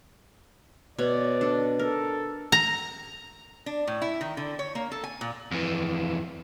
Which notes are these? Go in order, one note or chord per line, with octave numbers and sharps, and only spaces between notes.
B2 C#5 D5
D4 A4
A4 A#4
A#5
D4
A2
E4
D#3
D3
C#5
A#3
A4
G#5
A#2
F2 E3